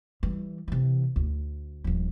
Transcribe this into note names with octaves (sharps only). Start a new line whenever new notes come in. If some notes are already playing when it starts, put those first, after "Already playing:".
E3 G3
C3 E3
D2
D#1 F3